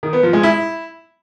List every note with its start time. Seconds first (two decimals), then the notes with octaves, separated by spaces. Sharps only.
0.03 D#3
0.13 B3
0.23 F3
0.33 G#3
0.43 E4